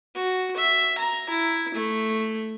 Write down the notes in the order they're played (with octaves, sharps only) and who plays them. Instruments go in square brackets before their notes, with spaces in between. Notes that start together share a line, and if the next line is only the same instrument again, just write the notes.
[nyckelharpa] F#4
E5
A#5
E4
A3